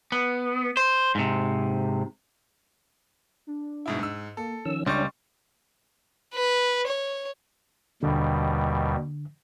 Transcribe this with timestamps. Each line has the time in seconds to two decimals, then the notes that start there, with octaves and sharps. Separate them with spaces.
0.12 B3
0.77 C5
1.15 G#2 C3
3.47 D4
3.86 G#2 B2 E4
3.99 G#2 E6
4.37 A#3 A4
4.65 D#3 F3 C#4 E6
4.86 C#2 G3 C#4 D4 D#5 C6 C#6
6.34 B4
6.87 C#5
8.03 D#2 B2 D3 G3